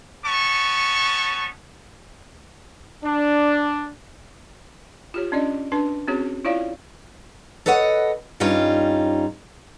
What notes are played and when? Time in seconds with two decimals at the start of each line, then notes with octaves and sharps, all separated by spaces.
0.24 B3 C#4 A5 C#6
3.03 D4
5.14 F4 G4 C#5
5.32 C#4 D4 D5 D#5
5.72 D4 B4 A5
6.08 C4 C#4 F#4 G#4 C#5
6.45 E4 F4 C#5 D5 F5
7.66 A4 B4 C#5 D#5 F#5
8.40 G2 G3 C#4 D#4 F4